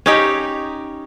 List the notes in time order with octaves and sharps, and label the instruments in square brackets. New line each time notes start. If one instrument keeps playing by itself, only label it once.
[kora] C#4 D#4 G4